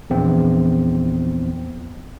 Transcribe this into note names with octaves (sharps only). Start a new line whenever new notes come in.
A#1 E2 C4